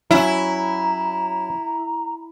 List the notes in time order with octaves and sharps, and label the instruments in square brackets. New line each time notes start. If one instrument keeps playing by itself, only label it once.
[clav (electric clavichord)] F#3 C#4 [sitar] E4 [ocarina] A#5